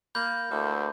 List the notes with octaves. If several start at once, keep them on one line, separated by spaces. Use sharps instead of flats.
A#3 B5 G6
D2 A3 A#3 E4